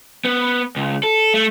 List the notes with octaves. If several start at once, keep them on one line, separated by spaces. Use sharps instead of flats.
B3
C#2
A4
A3